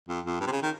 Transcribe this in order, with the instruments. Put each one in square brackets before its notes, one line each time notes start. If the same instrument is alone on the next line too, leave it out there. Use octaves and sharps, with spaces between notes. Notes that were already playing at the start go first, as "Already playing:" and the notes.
[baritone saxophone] F2
F2
G2
C3
C#3
D#3